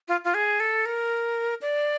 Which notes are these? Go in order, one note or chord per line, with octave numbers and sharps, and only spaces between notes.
F4
F4
G#4
A4
A#4
D5